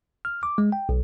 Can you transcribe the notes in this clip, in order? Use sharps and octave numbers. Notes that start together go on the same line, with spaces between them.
F6
D6
G#3
G5
B1